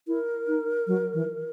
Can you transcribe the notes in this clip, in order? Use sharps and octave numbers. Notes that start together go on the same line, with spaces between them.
E4 A#4
D#4
F#3
E3